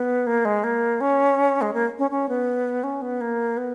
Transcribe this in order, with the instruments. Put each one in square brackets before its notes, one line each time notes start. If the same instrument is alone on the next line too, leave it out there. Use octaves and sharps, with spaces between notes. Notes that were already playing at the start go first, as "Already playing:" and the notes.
Already playing: [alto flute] B3
A#3
G#3
A#3
C#4
G#3
A#3
C#4
C#4
B3
C#4
B3
A#3
B3